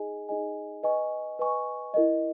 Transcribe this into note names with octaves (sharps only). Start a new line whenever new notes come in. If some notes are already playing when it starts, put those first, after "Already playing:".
Already playing: D#4 G#4 D#5 G#5
D#4 G#4 D#5 G#5
B4 D#5 G#5 C#6
B4 D#5 G#5 C#6
E4 A#4 D#5